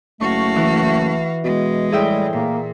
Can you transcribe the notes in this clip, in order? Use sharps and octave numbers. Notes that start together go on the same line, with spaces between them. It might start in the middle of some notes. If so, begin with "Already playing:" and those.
F#1 A3 F#4 F5 C#6
E3
B2 G#3
A2 G3 G#4 E5 G5
A#2 A#3